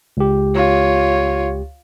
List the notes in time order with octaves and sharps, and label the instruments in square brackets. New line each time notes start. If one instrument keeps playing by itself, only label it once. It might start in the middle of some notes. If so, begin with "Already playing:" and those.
[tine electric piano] C#2 G4
[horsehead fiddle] F4 C#5